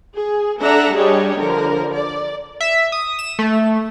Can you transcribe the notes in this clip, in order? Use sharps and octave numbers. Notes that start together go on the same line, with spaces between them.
G#4
D4 A4 E5 F#5 A#5
G3 D4 G4 G#4 C#5 D#5
D3 F3 A#4
D5
E5
D#6
E7
A3